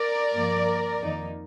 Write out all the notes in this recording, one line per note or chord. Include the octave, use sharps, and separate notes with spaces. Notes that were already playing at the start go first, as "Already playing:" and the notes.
Already playing: A#4 D5
G2 F3 A#3
F2 D#3 A#3 D#4